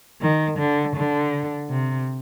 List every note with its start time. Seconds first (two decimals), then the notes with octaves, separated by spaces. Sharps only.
0.21 D#3
0.58 D3
0.96 D3
1.70 C3